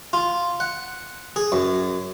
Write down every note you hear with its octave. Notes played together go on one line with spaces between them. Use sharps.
F4
F#5
G#4
F#2